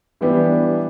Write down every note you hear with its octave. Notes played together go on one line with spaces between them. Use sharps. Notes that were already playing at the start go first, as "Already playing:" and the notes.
E3 G3 B3 D4 G4